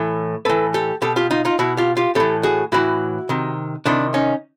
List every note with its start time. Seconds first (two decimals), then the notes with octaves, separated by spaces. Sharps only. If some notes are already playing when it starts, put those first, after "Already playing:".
Already playing: A2 E3
0.45 A2 E3 A4 B4
0.74 G4 A4
1.02 B2 G4 A4
1.16 F4 G4
1.31 D#4 F4
1.45 D#4 F4
1.59 B2 E4 F#4
1.77 F4 G4
1.97 F4 G4
2.15 A2 E3 G4 A4
2.43 F#4 G#4
2.72 A2 E3 E4 F#4
3.29 C3 D#3
3.86 C3 D#3 D4 E4
4.14 C#4 D#4